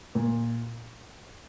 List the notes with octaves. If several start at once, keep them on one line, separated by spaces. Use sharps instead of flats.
A#2